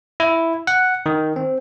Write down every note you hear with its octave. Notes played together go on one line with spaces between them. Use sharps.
E4
F#5
D#3
C4